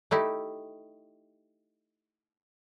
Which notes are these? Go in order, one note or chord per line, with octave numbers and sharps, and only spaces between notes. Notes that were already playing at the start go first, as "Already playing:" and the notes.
A3 D#4 E4 G4